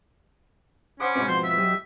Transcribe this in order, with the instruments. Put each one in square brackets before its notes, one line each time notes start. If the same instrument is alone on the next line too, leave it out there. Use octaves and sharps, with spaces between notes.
[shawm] C#4 [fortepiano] C5 F#5 D#6 [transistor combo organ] B5 D6
[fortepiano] G#2 B2 C4
[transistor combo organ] F3 B3 F#4 [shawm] C5
[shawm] E5
[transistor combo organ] F#3 G4 D#5